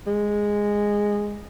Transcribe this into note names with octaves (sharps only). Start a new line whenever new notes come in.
G#3